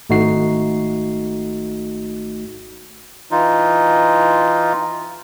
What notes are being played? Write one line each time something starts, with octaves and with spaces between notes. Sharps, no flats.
G#1 A3 D#4 F#4 C7
E3 D#4 F4